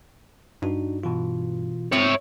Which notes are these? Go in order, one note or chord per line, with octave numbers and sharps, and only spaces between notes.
G2 D4 D#4 F#4
B2 E3 F4
C4 C#5 E5